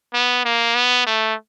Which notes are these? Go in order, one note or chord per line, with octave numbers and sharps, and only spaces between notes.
B3
A#3
B3
A3